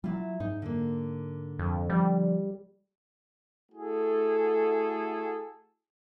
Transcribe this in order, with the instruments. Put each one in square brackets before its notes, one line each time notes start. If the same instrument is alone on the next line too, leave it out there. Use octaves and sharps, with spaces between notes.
[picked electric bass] F#3 G3 [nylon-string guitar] E4 F4
[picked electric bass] G#2 [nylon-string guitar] D#4
[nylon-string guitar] D3 A#3
[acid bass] F2
[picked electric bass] F3 [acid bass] G3
[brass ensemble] A3 E4 F#4 G#4 A4